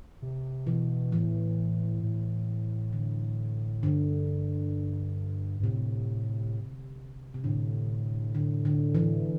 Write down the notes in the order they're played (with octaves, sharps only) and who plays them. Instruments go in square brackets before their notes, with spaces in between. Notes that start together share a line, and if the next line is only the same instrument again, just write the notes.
[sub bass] C3
[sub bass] B2 [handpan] E3
[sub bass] A2 [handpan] E3
[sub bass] A2
[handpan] D3
[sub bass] G2 [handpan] D3
[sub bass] G2
[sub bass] A2 [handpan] C3
[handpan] C3
[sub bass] A2 [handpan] D3
[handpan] D3
D3
E3